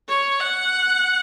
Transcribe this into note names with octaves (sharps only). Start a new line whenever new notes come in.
C#5
F#5